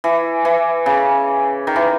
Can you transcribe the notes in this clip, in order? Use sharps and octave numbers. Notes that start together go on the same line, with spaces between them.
E3
E3
C#3
D#3
E3